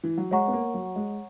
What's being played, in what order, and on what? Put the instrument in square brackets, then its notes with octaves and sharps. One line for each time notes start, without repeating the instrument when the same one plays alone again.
[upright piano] E3
F#3
[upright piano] G#3 [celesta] C#5 F#5 A#5 C#6
[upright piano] B3
A#3
F#3
G#3